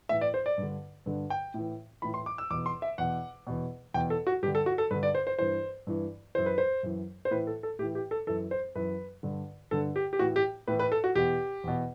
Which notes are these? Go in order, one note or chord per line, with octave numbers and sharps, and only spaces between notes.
A2 E3 E5
D5
C5
D5
G2 D3
G2 D3
G5
A2 E3
A2 E3 B5
C6
D6
E6
E2 B2 D6
C6
E5
E2 B2 F#5
E2 B2
E2 B2 G5
A4
F#4
G2 D3 G4
A4
F#4
A4
G2 D3 B4
D5
C5
C5
G2 E3 C5
G2 E3
F#2 E3 C5
B4
C5
F#2 E3
C5
A2 E3 B4
A4
A4
A2 E3 G4
G4
A4
F#2 E3 A4
C5
F#2 E3 B4
G2 D3
G2 D3 A4
G4
G4
A2 E3 F#4
G4
A2 E3 B4
B4
A4
F#4
E2 B2 G4
E2 B2